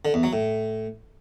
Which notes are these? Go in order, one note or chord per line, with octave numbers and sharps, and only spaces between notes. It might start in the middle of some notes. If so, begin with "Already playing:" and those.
D3
E2
F#3
A2